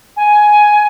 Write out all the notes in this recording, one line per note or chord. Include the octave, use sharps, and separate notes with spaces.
G#5